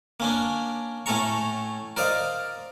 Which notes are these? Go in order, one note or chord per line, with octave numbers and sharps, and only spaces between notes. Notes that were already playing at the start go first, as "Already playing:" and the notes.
A#3 C#4 D4
A2 A3 C#4 A4 A#5 C#6
A#4 C5 D5 D#5 F5